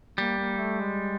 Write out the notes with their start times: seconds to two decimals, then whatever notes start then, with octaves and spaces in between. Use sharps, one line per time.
0.18 G3 A#3
0.39 A#3
0.59 A3
0.80 G#3